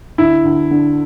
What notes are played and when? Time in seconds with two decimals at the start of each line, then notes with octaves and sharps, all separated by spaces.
0.18 D2 E4
0.44 D2
0.71 D3